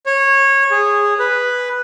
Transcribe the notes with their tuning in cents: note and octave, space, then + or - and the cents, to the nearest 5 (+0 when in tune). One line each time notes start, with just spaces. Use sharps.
C#5 -20
G#4 -15
B4 +0